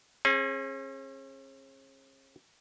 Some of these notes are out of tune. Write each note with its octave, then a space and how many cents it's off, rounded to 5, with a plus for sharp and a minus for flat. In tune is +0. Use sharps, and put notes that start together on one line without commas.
C#4 -45 G#4 +0